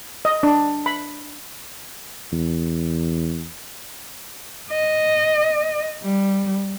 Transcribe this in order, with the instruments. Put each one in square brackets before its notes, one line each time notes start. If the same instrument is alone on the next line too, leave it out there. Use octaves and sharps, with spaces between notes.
[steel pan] D#5
D4
B5
[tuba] E2
[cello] D#5
G3